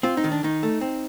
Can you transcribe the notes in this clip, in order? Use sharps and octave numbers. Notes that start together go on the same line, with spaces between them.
C4 F4
D#4
D#3
D4
D#3 D#4
A3
C4